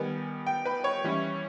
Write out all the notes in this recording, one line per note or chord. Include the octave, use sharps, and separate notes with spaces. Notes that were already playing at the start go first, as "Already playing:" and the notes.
Already playing: D#3 G3 B3 G#5
G5
B4
C#5
E3 G3 C#4 E4